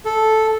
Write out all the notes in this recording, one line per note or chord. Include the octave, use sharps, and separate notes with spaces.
A4